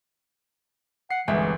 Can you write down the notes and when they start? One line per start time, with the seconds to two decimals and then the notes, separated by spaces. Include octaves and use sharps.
1.11 F#5 C7
1.28 G1 C2 E3 G#3 E5 G5 G#5